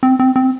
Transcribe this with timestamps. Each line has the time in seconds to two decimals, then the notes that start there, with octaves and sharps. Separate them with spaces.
0.03 C4
0.19 C4
0.36 C4